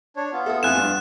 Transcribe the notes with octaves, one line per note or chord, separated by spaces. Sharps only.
D4 C#5
B3 F4
A4 E5 D#6
F2 E4 G#5 F#6 E7
G2 D4